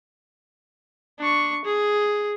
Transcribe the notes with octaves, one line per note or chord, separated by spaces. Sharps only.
D4 C#6
G#4